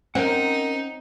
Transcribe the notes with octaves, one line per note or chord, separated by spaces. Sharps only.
C4 C#4 D#4 A#4 C5 F#5